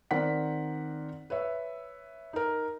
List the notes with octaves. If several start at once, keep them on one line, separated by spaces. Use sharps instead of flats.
D#3 C4 A#4 D5 F#5 B6
B4 C#5 E5
D#4 A#4